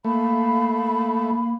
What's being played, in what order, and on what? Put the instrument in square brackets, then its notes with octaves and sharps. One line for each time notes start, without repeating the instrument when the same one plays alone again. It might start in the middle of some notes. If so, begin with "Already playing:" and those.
[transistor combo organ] A3 [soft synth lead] A#3 [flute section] F5 B5